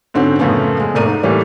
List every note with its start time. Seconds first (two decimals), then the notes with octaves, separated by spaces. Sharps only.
0.14 G#2 D3 C4 C#4 F#4
0.39 F#2 A2 C#3 F3 B3 C#4
0.80 G#3
0.95 F1 A2 A#3 D5 A#5 D#7
1.06 G#2
1.23 A2 E3 G3 A#3